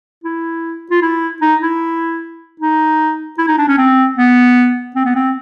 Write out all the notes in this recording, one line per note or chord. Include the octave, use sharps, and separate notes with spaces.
E4
F4
E4
D#4
E4
D#4
E4
D#4
D4
C#4
C4
B3
C4
B3
C4